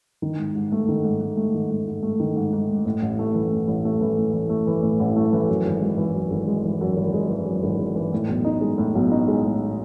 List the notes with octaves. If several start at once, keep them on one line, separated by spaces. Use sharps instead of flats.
D#3
G#2
G#2
A3
D#3
G#2
G#2
A3
D#3
G#2
G#2
A3
D#3
G#2
G#2
A3
A2
A1
A3
E3
A2
A1
A3
E3
A2
A1
A3
E3
A2
A1
A3
E3
F#2
G#1
G#3
E3
F#2
G#1
G#3
E3
F#2
G#1
G#3
E3
F#2
G#1
G#3
E3
A2
B1
D#4
G#3
A2
B1
D#4
G#3
A2